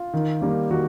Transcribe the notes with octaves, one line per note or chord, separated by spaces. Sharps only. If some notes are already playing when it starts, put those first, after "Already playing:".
Already playing: F4
D#3
G3 A#3
D#3 F#4